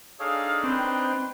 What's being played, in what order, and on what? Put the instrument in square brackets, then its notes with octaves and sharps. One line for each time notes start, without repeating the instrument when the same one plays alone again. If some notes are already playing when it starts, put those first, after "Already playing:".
[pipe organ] D4 D#4 [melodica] G#4 A4 C#5 [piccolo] F5
[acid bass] C4 [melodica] B4 C6 [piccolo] G5